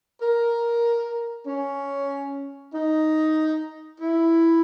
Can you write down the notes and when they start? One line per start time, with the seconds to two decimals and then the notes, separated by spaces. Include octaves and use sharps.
0.21 A#4
1.47 C#4
2.74 D#4
4.01 E4